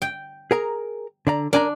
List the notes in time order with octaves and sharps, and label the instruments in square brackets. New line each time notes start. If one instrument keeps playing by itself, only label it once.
[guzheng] G5
[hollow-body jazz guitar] G#4 A#4 A#5
D3 D5 A#5
[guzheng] D4 [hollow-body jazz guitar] A#4 G#5 A#5